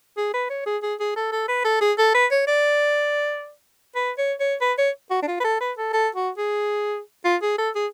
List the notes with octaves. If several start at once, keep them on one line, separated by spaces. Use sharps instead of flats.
G#4
B4
C#5
G#4
G#4
G#4
A4
A4
B4
A4
G#4
A4
B4
C#5
D5
B4
C#5
C#5
B4
C#5
F#4
D4
F4
B4
A4
B4
A4
A4
F#4
G#4
F4
G#4
A4
G#4